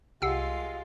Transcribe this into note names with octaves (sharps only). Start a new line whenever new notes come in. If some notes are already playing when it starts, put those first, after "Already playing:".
C2 G#3 F4 G4 F#5 E6 C7